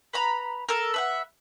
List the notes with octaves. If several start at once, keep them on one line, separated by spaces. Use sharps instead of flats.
B4 A#5 B5
A4 A#4
B4 E5 F#5